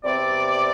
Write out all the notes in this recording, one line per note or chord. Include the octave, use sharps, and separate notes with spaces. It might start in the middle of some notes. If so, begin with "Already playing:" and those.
E2 C3 G3 C4 D5